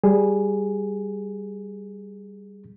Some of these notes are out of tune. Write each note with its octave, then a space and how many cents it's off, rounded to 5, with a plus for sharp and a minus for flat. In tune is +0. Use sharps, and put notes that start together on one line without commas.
G3 +0 G#4 +0